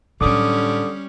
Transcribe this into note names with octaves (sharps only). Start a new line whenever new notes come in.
A2 D3 F#3 G3 C#4 D6 D#6